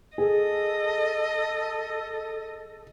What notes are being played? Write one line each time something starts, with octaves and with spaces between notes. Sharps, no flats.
G#4 A4 D#5